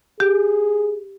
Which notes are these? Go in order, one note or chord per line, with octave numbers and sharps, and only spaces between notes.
G4 G#4